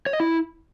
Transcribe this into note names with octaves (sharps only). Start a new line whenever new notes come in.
C#5
D#5
E4